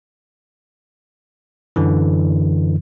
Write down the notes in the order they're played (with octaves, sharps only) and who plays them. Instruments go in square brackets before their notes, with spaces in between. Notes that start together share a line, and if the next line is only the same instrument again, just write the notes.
[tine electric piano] F#2 D3 E3